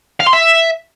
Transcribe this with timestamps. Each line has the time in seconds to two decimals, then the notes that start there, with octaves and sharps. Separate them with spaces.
0.20 F5
0.27 C6
0.34 E5